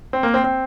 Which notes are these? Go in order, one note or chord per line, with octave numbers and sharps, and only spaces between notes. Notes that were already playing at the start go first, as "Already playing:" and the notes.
C4
A#3
C4
C4